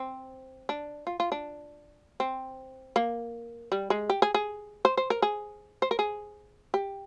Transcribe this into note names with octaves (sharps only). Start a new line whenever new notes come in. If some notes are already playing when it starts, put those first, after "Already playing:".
Already playing: C4
D4
F4
F4
D4
C4
A#3
G3
G#3
G4
G#4
G#4
C5
C5
A#4
G#4
C5
A#4
G#4
G4